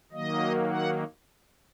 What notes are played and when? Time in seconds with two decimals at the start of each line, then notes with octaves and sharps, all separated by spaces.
0.12 D#3 F#3 A#3 D#5
0.70 F#5